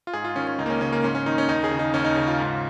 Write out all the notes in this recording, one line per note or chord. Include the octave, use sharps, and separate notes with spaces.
F4
G#2 G#4
F4
D#3 C#4
C#4
C#2 D#4
A#3
C#4
C#3 C#4
A#3
G#2 C#4
C#4
D#3 D#4
C#4
D#2 D#4
G#4
C#3
D#4
D#2 C#4
D#4
C#3
F4
G#2